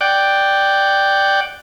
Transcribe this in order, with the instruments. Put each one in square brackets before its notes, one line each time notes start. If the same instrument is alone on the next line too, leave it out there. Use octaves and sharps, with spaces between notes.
[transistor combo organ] D5 F#5 G5